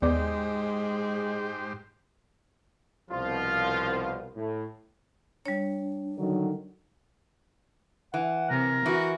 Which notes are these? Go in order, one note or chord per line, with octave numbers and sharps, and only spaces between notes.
D#2 G#2 G#3 B3 G4 C5 D5
C2 B2 F3 F4
A2
G3 D4 C#5
D3 D#3 F#3
E3 F#5
C3 A#4
E3 F#4